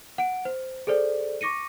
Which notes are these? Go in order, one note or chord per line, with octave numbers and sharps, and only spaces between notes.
F#5 D7
C5
G#4 A4 C5 D5
C#6 D6 A#6 C#7 D#7